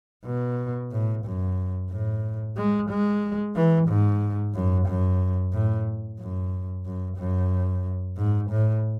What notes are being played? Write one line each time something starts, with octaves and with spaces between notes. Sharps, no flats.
B2
A2
F#2
A2
G#3
G#3
E3
G#2
F#2
F#2
A2
F#2
F#2
F#2
G#2
A2